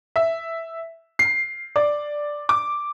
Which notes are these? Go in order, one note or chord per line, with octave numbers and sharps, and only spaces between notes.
E5
C7
D5
D6